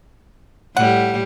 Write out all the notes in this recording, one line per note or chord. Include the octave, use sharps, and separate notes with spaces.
A2 G3 F#5